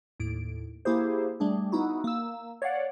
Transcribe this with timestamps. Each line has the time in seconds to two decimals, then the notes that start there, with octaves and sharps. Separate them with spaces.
0.20 D#2 A2 D7
0.85 A#3 E4 G4 G#4 C5
1.40 G3 A3 D4 G#4
1.72 B3 D#4 E4 F#4
2.04 A#3 E6
2.62 C#5 D5 F5 F#5